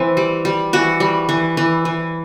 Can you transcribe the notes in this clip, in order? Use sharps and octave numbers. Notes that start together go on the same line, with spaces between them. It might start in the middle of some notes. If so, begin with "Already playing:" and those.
Already playing: E3 C4
G3
G3
E3 F#4
G3
E3
E3
E3